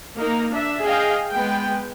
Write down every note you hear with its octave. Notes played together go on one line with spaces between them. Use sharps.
A#3 D#4 A#4
D4 E5
G#4 D#5 F5 G5
G#3 B3 G5